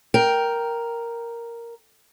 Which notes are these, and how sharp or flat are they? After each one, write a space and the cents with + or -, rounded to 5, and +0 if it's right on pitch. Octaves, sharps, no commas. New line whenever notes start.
A#4 +0 G5 -5